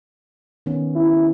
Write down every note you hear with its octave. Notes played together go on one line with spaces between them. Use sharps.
D#3 B3 C#4
E4